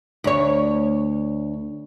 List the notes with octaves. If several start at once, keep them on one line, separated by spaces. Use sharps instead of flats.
D2 C#5